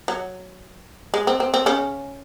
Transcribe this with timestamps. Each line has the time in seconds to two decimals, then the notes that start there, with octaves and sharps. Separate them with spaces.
0.08 F#3
1.14 G#3
1.27 C4
1.40 C4
1.54 C4
1.66 C#3 C#4